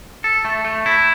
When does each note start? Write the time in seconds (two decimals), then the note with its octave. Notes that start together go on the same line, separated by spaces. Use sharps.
0.24 A4
0.45 A3
0.65 A3
0.86 E4